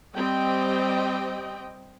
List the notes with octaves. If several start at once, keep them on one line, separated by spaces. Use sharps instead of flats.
G3 C4 D#5 G5